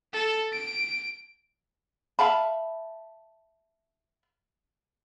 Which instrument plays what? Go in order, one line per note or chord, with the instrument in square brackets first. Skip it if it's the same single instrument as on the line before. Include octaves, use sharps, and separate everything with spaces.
[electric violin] A4
D7
[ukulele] E5 F5 A5 B5